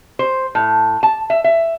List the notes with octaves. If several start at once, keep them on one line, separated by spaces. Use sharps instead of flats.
C5
A2
A5
E5
E5